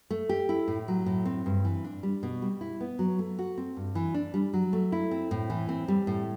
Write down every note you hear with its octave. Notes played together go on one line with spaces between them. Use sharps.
A3
G4
E4
A2
F#3
A2
C4
G2
E3
D4
G3
B2
G3
E4
B3
F#3
A3
F#4
C4
G2
E3
D4
G3
F#3
A3
E4
C4
A2
E3
C4
G3
A2